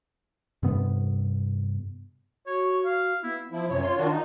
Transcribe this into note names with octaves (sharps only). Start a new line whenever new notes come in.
G2 C3 B3
F#4 C#5
F5
B3 E4
F3 E4
F#2 C3 C#5
F4 C#5 C6
D#3 D4 F4 F#4
D#4